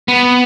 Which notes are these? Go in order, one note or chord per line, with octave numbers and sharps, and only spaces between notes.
B3